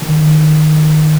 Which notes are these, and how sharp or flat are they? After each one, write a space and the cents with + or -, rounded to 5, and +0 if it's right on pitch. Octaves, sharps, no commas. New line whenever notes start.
D#3 -15